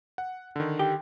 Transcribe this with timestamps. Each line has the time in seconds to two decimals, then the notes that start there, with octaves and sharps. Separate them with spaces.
0.18 F#5
0.56 D3 D#3
0.79 G4